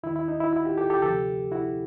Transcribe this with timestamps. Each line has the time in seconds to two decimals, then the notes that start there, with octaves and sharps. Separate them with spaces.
0.03 D#2 D#3 E4
0.16 E4
0.28 D#4
0.40 E4
0.53 E4 F#4
0.65 F4 G4
0.77 G4 A4
0.90 G4 A4
1.02 D2 C3 F3 G4 A4
1.52 E4 F#4